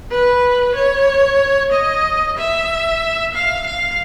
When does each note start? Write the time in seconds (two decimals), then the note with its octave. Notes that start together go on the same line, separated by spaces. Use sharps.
0.11 B4
0.75 C#5
1.72 D#5
2.37 E5
3.35 F5
3.66 F5